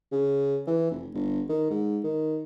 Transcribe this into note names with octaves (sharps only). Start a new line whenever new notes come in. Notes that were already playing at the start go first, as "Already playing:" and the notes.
C#3
E3
F1
G1
D#3
G#2
D#3